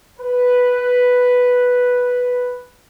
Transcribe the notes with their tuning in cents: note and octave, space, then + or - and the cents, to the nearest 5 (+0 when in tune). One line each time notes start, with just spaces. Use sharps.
B4 +0